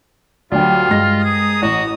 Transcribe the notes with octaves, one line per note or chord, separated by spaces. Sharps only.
D2 F#3 G3 D4 F4 G5
G2 G#3 A#6
G#4 A#5 D#6
A1 F#4